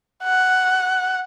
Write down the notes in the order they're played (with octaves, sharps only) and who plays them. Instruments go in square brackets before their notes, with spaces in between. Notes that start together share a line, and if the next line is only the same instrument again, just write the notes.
[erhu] F#5